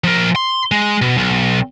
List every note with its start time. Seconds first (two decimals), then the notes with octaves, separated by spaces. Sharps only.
0.04 F3 A#4
0.36 C6
0.71 G#3
1.02 B2
1.18 B1